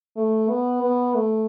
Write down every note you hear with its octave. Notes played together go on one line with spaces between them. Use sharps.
A3
B3
B3
A3